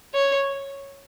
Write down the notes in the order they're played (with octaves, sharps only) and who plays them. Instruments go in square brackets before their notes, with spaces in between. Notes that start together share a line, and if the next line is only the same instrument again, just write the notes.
[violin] C#5